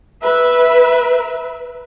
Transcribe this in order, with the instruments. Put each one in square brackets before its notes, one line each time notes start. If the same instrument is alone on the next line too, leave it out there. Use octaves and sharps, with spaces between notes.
[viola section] B4 E5